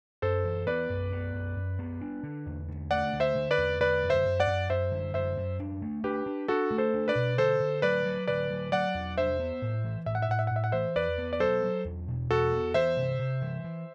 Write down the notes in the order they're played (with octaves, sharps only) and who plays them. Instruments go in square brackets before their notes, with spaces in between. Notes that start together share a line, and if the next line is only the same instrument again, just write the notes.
[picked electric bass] F#2 [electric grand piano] A4 C5
[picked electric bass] E3
[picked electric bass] B3 [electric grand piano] B4 D5
[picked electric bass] F#2
B3
F#2
F#2
B3
D4
D3
E2
D3
[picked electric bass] A3 [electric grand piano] D5 F#5
[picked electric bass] D3
[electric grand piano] C5 E5
[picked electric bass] D3
[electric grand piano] B4 D5
[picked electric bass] E2
[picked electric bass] D3 [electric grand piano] B4 D5
[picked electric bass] F#2
[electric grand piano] C5 E5
[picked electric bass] F#2
[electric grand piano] D5 F#5
[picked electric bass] F#2
[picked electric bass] F#2 [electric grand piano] C5 E5
[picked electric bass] D3
[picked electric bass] F#2 [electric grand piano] C5 E5
[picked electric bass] F#2
D4
A3
[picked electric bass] D4 [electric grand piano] G4 B4
[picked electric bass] D4
[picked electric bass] D4 [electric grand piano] F#4 A4
[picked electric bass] A3
[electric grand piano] A4 C5
[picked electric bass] D4
[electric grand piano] B4 D5
[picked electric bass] B2
[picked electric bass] D3 [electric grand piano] A4 C5
[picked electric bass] D3
[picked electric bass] F#3 [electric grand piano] B4 D5
[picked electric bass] F#3
[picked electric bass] D3 [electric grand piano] B4 D5
[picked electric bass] F#3
[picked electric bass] F#3 [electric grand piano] D5 F#5
[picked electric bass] E2
[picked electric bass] D4 [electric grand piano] C5 E5
[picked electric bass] B3
A2
E3
[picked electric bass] A2 [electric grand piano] E5
[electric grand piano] F#5
E5
[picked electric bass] A2 [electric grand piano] F#5
[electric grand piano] E5
F#5
[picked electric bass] A2 [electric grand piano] E5
[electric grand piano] F#5
[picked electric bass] E3 [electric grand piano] C5 E5
[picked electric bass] E2 [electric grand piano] B4 D5
[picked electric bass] B3
[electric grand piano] D5
[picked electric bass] F#3 [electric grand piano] A4 C5
[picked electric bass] F#3
E2
B2
[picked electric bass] E2 [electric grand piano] F#4 A4
[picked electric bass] B3
[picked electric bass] E3 [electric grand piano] C5 E5
[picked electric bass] C3
C3
E3
E3